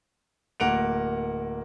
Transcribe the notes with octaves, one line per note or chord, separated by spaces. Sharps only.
D1 A#3 A#4 F#5 D7 F7